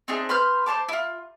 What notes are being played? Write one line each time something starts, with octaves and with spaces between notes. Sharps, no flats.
C4 D4 D#4 G#4
B4 C6 F6 G6
C5 C#5 A5 D6
E4 F4